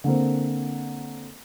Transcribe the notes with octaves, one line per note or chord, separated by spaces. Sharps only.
D3 A#3 C4